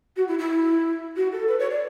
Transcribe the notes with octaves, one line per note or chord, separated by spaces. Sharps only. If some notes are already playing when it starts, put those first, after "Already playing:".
F#4
E4
E4
F#4
A4
B4
C#5
D5